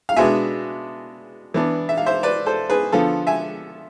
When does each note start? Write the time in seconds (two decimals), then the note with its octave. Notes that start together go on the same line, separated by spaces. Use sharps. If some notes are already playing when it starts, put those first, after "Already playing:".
0.09 F5
0.17 B2 G#3 B3 D4 E5 G#5
1.54 E3 B3 D4
1.89 E5
1.98 F5
2.06 C5 E5
2.23 B4 D5
2.46 A4 C5
2.70 G#4 B4
2.92 D3 F3 B3 F4 A4
3.27 E5 G#5